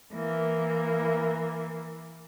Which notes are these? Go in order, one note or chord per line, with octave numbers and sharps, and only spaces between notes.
E3 A#3